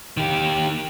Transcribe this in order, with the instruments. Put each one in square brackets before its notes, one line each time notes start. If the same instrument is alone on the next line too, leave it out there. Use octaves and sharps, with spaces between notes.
[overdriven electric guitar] D#3 G4